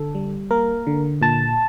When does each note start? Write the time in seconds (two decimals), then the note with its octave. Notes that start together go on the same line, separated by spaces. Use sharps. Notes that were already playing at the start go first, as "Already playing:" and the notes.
Already playing: D3 A4
0.15 G3
0.51 A#3 A#4
0.87 D3
1.22 A#2 A5